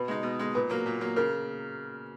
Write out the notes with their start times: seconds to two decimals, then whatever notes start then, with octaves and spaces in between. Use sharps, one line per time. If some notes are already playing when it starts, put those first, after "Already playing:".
Already playing: B2 B4
0.08 G#3 D#4
0.23 B2
0.39 G#3 D#4
0.55 A#2 B4
0.70 F#3 A#3
0.86 A#2
1.01 F#3 A#3
1.16 C#3 A#4